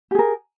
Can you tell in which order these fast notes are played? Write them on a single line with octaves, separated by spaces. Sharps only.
G4 G#4 A#4